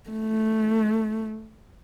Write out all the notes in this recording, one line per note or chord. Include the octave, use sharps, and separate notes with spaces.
A3